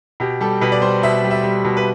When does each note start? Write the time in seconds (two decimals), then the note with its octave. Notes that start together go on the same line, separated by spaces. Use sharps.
0.20 B2 G4
0.41 G3 A4
0.61 B2 B4
0.72 D5
0.82 G3 C5
1.03 B2 E5
1.24 G3
1.31 E5
1.44 G3
1.65 B2
1.77 B4